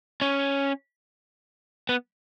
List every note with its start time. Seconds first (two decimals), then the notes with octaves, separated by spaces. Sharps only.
0.22 C#4
1.89 B3